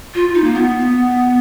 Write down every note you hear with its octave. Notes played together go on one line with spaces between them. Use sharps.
F4
D#4
A#3
B3